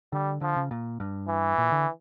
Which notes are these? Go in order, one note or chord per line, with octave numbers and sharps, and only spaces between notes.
D3 G3
D3 F3
C#3
A#2
G2
E3
A#2
D3